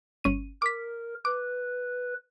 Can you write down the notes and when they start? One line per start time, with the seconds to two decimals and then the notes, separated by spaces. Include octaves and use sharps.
0.24 G1 C#4 D#7
0.62 A#4 D6 B6
1.25 B4 D6